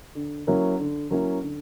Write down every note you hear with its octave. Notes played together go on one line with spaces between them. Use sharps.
D3
F#3 A#3 C#4 E4
D3
F#3 A#3 C#4 E4
D3